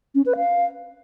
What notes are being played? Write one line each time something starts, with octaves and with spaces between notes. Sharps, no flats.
C#4
B4
F5